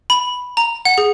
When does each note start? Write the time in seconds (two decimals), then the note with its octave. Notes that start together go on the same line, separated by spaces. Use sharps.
0.10 B5
0.57 A#5
0.85 F#5
0.98 G#4